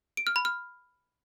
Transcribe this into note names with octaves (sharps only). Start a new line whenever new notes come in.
D7
F6
B5
F6